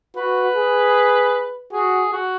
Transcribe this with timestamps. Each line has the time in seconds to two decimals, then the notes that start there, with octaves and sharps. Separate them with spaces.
0.17 F#4 B4
0.56 G#4
1.73 F#4 G#4
2.13 F#4